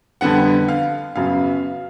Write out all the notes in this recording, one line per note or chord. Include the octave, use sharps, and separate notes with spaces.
F2 D3 G3 B3 F#5
F5
F#2 C#3 F#3 B3 F5